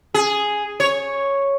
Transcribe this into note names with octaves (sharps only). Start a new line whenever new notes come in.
G#4
C#5